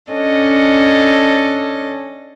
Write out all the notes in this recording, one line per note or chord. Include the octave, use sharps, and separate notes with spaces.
C#4 D4 A4 D#5